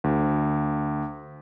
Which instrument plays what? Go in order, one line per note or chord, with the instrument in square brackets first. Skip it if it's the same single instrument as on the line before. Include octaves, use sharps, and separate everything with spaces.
[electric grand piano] D2